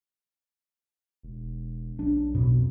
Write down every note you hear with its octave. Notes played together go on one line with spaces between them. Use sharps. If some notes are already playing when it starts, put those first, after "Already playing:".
E1
B1 D4
F2 B2